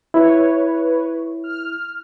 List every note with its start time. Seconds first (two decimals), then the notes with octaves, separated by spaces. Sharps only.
0.14 E4 B4 C#5
1.44 F6